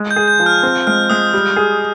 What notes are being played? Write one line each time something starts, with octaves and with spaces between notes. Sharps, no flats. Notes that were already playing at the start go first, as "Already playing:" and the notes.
Already playing: G#3
G6
G#4
G6
F3
F6
C4
G#3 F6
G#3 D#6
G3
G#4